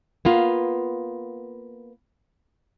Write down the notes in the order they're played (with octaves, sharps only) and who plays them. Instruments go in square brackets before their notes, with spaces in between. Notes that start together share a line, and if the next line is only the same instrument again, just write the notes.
[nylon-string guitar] A#3 B3 F4